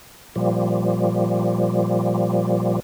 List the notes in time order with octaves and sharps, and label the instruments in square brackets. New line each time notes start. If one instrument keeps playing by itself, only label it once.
[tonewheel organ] A#2 F3 G3